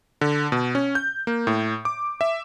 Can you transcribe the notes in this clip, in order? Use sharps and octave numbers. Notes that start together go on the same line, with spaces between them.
D3
B2
C#4
G6
A#3
A2
D6
E5